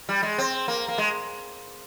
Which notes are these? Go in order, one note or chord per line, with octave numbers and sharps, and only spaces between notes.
G3
G#3
C4
A#3
A#3
G#3